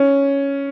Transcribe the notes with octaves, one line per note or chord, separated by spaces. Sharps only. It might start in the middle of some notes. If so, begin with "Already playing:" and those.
Already playing: C#4